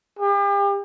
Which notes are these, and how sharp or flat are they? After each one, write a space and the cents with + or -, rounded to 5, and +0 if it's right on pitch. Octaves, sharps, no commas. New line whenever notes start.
G4 +40